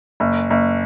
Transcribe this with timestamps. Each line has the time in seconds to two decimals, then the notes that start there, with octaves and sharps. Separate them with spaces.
0.20 F#1
0.50 F#1